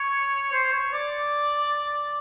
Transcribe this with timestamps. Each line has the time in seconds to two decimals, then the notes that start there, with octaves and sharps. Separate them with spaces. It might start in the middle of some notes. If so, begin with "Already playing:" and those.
Already playing: C#5
0.53 C5
0.73 C#5
0.93 D5